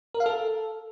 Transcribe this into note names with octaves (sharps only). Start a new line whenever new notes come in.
A#4
F5
A4